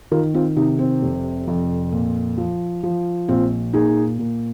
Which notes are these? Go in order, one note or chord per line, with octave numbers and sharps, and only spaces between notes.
D#3 F4 A#4
C4 F4
C3 D#4
C4
F1
F2
A#2
F3
F3
A#1 C4 F4
A#2 D#4 G#4
A#2